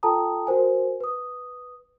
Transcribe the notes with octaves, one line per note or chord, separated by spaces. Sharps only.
F4 A4 G5 A5 A#5 D#6
F#4 A#4 C5 G#5
B4 D#6